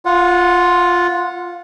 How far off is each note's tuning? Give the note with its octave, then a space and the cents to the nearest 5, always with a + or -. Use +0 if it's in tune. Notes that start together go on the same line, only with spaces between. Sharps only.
F4 +0 F#5 -25